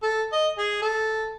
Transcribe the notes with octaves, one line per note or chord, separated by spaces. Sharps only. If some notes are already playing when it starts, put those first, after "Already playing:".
A4
D#5
G#4
A4